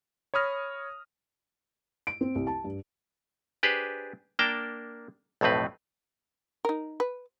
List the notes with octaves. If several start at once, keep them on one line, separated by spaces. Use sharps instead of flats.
C#5 B5 D#6 F6 A#6
D7
C4
C2
A5
G2
D4 G4 G#4 B4 C5
A#3 D4 A#4 G5 A5
B1 F2 A2 C4 B4
D#4 A#4
B4